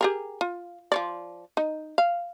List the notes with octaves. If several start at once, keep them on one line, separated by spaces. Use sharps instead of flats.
G4 G#4 A#4
F4
F3 C#5 D5
D#4
F5